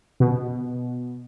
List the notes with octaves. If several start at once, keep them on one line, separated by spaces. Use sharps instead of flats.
B2